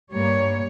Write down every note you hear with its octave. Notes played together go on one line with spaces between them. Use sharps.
G2 G3 A#3 C#5